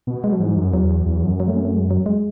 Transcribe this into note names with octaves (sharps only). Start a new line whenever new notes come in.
B2
G#3
F#3
G#2 E3
F#2
E2 F#3
E2
F#2
F#3
A3
C#4
A3
G#3
F#3
G#3